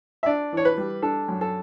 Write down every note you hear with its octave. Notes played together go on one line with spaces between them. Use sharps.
E5
D4 D5
E3 C#5
B4
G3
D4 A4
F#2
A4